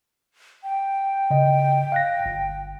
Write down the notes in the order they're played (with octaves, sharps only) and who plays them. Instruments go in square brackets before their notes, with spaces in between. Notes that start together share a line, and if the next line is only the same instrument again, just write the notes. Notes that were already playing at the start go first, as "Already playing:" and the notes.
[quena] G5
[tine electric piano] C#3 D#5
F5 F#6 A#6
G1